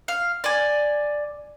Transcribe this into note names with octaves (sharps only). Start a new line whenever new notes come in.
F5
D5 G#5